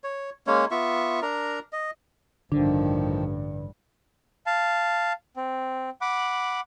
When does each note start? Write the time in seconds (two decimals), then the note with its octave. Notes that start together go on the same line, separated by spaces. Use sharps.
0.04 C#5
0.47 G#3 A#3 C#4 C#5
0.71 B3 F4 E5 C#6
1.22 D4 A#4 A#5
1.73 D#5
2.52 A1 G2 D3 D#3 F3 D4
4.46 F5 A5
5.36 C4
6.01 F#5 B5 D6